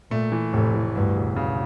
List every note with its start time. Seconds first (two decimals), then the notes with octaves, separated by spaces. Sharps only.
0.11 A#2 A3
0.32 E3
0.53 F1 A2
0.74 E3
0.95 D2 G2
1.16 E1
1.36 C#3